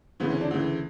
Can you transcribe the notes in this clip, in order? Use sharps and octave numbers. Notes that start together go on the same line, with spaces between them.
D2 C#3 E3 B3
C#4
D4
D2 C#3 E3